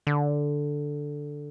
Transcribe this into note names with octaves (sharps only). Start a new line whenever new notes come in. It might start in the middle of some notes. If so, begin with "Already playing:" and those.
D3